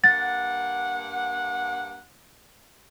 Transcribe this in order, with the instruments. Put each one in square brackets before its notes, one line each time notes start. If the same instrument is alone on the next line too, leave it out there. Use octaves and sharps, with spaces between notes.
[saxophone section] G2 A#3 F#5 [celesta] A6